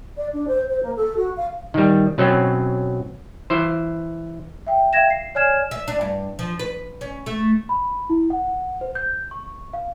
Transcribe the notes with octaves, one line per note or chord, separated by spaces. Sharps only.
D5
D4
C5
C5
A#3
A4
F#4
F5
D#3 G3
B2 F#3 C4 C#4
E3 C5
E5 G5
E5 F5 G5 G#6 A#6 E7
C7
C#5 D5 G#5 F6 G#6 E7
E5
D4
G2
F3
B4
C#4
A3
B5
E4
F#5
C5
G6
C#6
F5